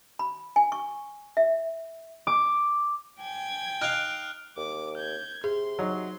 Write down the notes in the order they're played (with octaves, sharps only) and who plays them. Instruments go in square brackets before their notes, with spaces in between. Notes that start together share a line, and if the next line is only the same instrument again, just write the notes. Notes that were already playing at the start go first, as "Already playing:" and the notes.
[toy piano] B5
G#5
C#6
E5
[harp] D6
[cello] G5 [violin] G#5 G#6
[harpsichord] D#4 F5 [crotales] F6 F#6 D7
[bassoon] D#2 [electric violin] D6
[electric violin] G6 G#6
[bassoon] C3 [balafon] G#4 [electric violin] C6
[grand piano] F#3 D#4